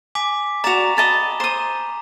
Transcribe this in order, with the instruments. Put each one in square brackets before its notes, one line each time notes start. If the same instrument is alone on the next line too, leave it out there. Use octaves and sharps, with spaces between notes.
[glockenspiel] G#5 D6 B6
[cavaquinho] F#4 D5 [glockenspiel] A#5 E7 F7
[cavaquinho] D#5 A5 B5
[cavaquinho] C5 D#6 [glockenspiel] A#5